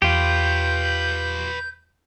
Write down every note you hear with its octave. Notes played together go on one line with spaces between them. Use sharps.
E2 F4 G4 B4 C#5 G6